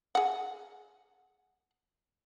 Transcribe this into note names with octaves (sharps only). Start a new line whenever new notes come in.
G#4 F#5